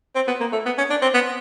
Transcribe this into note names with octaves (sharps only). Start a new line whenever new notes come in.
C4
B3
A#3
A3
B3
C#4
D4
C4
B3